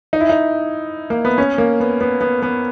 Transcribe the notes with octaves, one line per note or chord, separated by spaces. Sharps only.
D#4
E4
D#4
A#3
B3
C#4
A#3
B3
B3
B3
B3